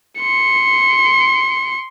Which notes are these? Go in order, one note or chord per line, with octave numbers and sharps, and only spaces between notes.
C6 C#7